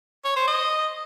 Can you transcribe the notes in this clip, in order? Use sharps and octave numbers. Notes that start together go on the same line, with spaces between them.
C#5
C5
D#5